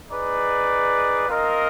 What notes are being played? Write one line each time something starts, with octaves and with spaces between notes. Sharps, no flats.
D#4 G#4 B4 D5
C4 F4 A#4 D#5